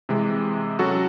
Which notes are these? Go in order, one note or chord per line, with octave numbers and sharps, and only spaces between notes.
C3 E3 G#3
F#3 C#4 F#4 A4